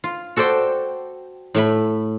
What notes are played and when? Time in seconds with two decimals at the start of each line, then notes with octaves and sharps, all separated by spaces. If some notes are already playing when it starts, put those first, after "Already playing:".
0.04 F4
0.36 F#4 A4 C5 D5 G5
1.54 A2 A3 B5